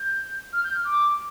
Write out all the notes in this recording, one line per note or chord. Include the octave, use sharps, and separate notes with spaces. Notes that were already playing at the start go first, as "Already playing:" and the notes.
Already playing: G6
F6
G6
F6
D6